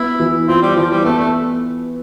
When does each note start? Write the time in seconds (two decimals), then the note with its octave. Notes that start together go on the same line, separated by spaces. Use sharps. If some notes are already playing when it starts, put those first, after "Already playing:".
Already playing: B3 E4
0.20 E3
0.48 C4 F4
0.62 G3
0.76 E3 F3
0.90 G3
1.04 A3 B3
1.19 A3